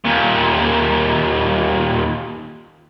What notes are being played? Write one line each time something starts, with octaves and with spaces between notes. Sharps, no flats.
D#2 A#2